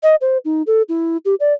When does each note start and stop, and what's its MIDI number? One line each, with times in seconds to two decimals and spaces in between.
0.03 0.15 75
0.21 0.38 72
0.45 0.62 63
0.67 0.82 69
0.89 1.17 64
1.25 1.35 67
1.40 1.53 74